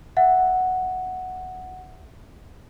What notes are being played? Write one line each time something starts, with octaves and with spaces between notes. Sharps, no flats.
E5 F#5